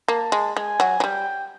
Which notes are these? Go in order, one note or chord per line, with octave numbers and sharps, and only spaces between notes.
A#3 A5
G#3
G#3 G#5
F#3
F#3
G3 G5